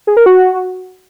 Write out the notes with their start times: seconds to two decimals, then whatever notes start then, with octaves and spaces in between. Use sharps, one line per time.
0.07 G#4
0.17 A#4
0.26 F#4